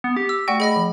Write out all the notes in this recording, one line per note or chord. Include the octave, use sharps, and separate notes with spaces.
B3
G4
E6
A3 F#4 D5 F#5 G5
G#4 D#5 B5 A#6
F3